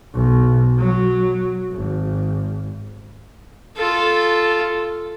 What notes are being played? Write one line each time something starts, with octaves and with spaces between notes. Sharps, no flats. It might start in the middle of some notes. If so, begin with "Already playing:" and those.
B1
F#3
G#1
F4 A4